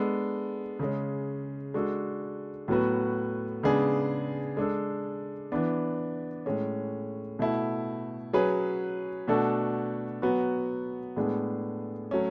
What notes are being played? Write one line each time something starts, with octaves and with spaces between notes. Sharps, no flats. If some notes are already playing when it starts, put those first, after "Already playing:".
Already playing: G#3 B3 D4 A4
C#3 G#3 C#4
G#3 D4 F#4 A4
A2 F#3 B3 F#4 B4
C#3 G#3 B3 D4 G#4
G#3 D4 A4
E3 B3 D4
A2 G#3 C#4
B2 A3 E4
F#3 C#4 G#4 B4
B2 A3 D4 F#4 A4
F#3 B3 F#4 B4
A2 G#3 B3 D4 G#4
F#3 A3 C#4